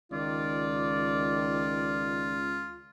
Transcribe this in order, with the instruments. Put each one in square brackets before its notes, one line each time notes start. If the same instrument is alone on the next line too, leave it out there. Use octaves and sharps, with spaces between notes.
[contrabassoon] C#2 [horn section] D#3 D5 [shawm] F4